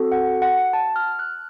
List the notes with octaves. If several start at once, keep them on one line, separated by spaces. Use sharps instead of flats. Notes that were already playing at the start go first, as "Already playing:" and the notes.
Already playing: C4 F#4 A4
F#5
F#5
A5
F6
F#6